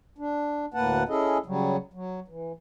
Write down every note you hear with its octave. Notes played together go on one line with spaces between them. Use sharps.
D4
D2 A2 A#3 B4 F#5 A5
C#4 E4 G#4 A4 D#5
C#3 F#3 G3
F#3
E3